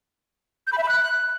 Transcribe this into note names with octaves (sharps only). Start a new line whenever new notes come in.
G6
B5
E5
B5
F#6